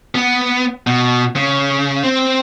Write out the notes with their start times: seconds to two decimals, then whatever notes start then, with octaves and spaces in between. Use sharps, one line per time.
0.15 B3
0.87 B2
1.36 C#3
2.03 C4